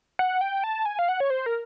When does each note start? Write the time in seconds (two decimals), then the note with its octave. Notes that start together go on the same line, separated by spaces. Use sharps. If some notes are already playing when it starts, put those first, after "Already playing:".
0.19 F#5
0.41 G5
0.64 A5
0.86 G#5
0.99 F5
1.08 F#5
1.20 C#5
1.30 C5
1.46 A#4